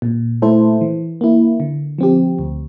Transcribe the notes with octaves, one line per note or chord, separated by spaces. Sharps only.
A#2
A3 E4 A4 C5
E3
A#3 E4
D3
F3 C4 G4
D2